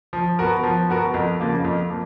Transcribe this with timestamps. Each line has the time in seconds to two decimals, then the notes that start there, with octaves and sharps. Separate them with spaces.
0.13 F3
0.39 B3 F#4 A#4
0.64 F3
0.90 B3 F#4 A#4
1.14 F2
1.40 C#3 F3 A#3 F4
1.65 F2
1.90 F3 A#3